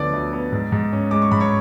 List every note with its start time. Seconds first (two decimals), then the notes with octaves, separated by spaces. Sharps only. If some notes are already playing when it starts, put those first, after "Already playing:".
Already playing: D2 D3 F3 B3 C#5 D5 D6
0.13 D2
0.33 B3
0.52 G#2
0.72 G#2
0.93 C#4
1.11 G#3 D6
1.22 C#6
1.31 G#2 B5
1.40 C#5 C#6